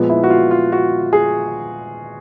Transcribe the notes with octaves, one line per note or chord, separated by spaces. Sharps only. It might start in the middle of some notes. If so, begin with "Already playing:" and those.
Already playing: A#2 F3 G#3 B3
E4
F#4
F4
F4
F#4
G#4